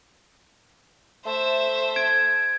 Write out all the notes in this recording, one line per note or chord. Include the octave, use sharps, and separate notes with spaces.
A3 C5 E5
G#6 D7